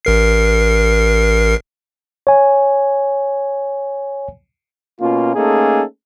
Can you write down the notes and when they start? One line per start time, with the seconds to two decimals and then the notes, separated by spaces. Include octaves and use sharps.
0.05 A1 A#4 C7
2.27 C#5 G#5
5.00 B2 A#3 C#4 F4
5.35 A3 A#3 C#4 D#4 G#4 A4